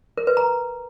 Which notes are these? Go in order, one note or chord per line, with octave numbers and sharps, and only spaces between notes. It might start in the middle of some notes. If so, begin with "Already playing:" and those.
A#4
B4
A#5